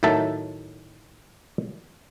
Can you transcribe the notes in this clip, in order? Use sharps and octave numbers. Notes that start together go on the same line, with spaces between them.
A2 D#3 F#3 E5 A5